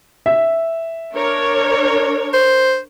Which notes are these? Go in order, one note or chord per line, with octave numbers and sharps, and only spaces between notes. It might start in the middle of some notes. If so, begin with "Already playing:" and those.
E5
D4 A#4 C#5
C5